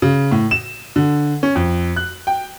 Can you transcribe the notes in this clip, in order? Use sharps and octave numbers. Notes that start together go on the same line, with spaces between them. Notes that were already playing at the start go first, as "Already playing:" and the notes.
C#3
A2
E7
D3
C#4
F2
F#6
G5